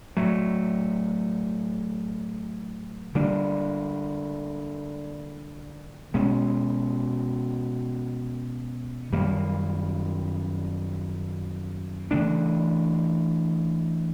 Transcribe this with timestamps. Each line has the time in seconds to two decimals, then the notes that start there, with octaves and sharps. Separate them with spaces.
0.16 A2 F#3 A3
3.15 D3 G3 A#3 D4
6.14 B2 G#3 C#4
9.12 F#2 D#3 G3 A#3
12.11 C#3 E3 A3 D4